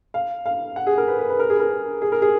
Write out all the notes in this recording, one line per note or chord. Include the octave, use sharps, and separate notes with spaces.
F5
F5
F#5
G#4
A#4
B4
B4
B4
A#4
G#4
A#4
G#4
A#4
G#4